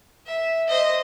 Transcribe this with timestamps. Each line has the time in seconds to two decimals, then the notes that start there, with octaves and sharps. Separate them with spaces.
0.26 E5
0.68 C5 D#5